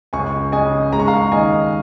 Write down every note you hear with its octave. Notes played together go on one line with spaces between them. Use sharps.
C#2 G#5 C#6
C#3 D#5 G#5
G#3 A#5
C#6
F5 A#5
D#2 D#5 G#5